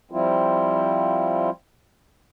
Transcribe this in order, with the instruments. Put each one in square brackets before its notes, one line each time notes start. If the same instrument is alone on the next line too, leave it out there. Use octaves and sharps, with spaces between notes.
[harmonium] F3 G3 C4 E4 F4